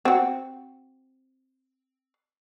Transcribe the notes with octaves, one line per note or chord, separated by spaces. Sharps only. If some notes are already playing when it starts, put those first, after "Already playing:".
C4 F#4